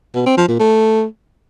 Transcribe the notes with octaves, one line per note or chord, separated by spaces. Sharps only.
B2
C4
F3
A#2
A3